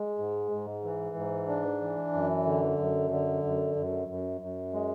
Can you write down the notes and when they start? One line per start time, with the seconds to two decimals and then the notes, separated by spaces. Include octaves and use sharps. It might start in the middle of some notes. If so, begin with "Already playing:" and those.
Already playing: G#3
0.18 G#2
0.51 G#2
0.84 E3
1.16 G#2
1.48 D4
1.81 E3
2.13 F#2
2.45 D3
2.79 F#2
3.11 D3
3.44 F#2
3.76 F#2
4.08 F#2
4.41 F#2
4.73 G#3